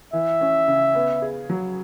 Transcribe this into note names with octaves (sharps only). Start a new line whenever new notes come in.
E3 E5
C#4
C#3
B3
G#4
F#3